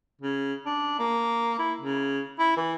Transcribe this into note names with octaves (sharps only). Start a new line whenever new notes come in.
C#3
D4
A#3
E4
C#3
E4
E3